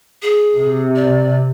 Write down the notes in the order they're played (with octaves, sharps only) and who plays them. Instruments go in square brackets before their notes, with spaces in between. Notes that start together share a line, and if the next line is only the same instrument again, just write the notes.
[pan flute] G#4
[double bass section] C3
[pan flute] D5